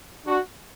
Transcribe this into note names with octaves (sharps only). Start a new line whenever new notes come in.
D4 F#4